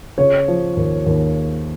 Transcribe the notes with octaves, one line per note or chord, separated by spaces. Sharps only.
C#3 C#5
F3
D#2
D#2